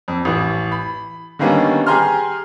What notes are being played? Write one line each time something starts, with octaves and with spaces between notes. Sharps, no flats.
F2
A1 E3
B5
D3 D#3 G3 A#3 B3 C#4
G4 G#4 G#5 A#5 C6 F6